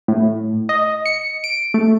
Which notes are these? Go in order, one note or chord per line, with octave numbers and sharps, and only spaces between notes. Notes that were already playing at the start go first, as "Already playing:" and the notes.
A2
D#5
C#7
D7
A3